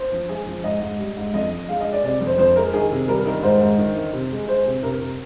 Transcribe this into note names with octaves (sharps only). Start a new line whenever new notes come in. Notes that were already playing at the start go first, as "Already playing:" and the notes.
Already playing: C5
F3
G#3 G#4
F3
G#2 D#5
G#2
G3
G#2
F2 D#5
F2
G#3 F5
D#5
G#3
D5
C3 D5
F2
C5
F2 C5
G#3 A#4
D#3 G#4
C3
G3 A#4
D#3
G#2 C5
G#2
D#3
D#3
C3
G#3
G#3 C5
C3
C3 A#4
C3